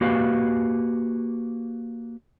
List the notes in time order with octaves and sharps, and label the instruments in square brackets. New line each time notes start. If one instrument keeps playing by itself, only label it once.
[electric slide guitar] A#3 F#4 G4 B4 F5